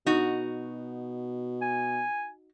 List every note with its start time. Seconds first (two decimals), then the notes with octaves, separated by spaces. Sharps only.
0.06 B2 D#4 F#4
1.62 G#5